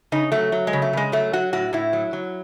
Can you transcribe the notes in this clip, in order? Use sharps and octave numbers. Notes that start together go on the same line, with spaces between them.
C#3 D#4
F#3 A3
F#3
G#3
C#3
A3
C#3 G#3
F#3 A3
F#3 F#4
A2 F#4
A2 E4
F#3
F#3